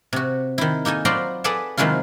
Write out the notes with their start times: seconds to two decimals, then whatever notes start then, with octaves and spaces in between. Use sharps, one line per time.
0.13 C3 F#4
0.58 D#3 E4
0.85 A#3 D#4 A4 G#5
1.05 F#3 F4 C5 D5 A#5 B5
1.44 G#4 A4 B4 D5 F#5 A5
1.77 C3 D#3 F#3 G#3 E4 F4